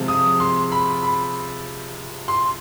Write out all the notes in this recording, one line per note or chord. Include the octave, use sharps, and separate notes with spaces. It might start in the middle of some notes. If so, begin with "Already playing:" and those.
Already playing: C3 F3 G#3
D#6
C6
B5
B5
C6